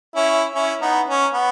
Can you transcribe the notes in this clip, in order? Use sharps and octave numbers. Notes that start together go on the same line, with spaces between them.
C#4 E4
C#4 E4
B3 D#4
C#4
B3